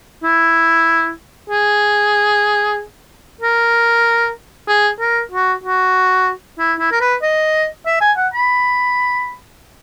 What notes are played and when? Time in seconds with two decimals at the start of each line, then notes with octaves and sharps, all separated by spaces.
0.23 E4
1.50 G#4
3.41 A#4
4.68 G#4
4.99 A#4
5.31 F#4
5.64 F#4
6.59 E4
6.79 E4
6.92 A#4
7.00 B4
7.22 D#5
7.86 E5
8.01 G#5
8.17 F#5
8.34 B5